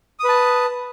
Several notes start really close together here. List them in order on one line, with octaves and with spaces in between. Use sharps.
D#6 B4 A5